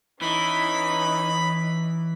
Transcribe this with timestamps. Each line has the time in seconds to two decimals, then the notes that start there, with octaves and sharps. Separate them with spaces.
0.21 E3 C#4 D#4 B5